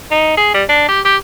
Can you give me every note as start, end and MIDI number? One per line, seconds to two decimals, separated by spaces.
0.11 0.37 63
0.37 0.51 68
0.54 0.64 55
0.69 0.84 62
0.88 1.00 67
1.05 1.16 67